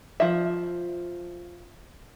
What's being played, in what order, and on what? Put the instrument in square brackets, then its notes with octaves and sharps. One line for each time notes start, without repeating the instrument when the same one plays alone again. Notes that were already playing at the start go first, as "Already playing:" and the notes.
[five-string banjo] F3 E5